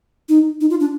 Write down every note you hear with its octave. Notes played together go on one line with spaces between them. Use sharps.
D#4
D#4
F4
D4